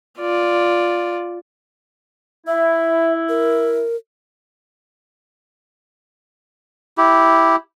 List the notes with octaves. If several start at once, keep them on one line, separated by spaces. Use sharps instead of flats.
F4 D5
E4 E5
A#4
E4 G4